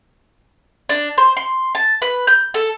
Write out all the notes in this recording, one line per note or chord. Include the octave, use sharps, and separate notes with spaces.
D4
C5
C6
A5
B4
G6
A4